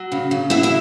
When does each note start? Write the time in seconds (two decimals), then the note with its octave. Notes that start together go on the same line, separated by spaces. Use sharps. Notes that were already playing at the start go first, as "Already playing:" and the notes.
Already playing: F#3
0.12 C#3
0.31 C#3
0.50 F#3 E4 E5
0.63 E4 E5